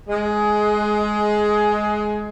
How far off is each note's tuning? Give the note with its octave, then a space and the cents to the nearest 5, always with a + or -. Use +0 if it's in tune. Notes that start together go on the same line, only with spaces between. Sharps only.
G#3 +15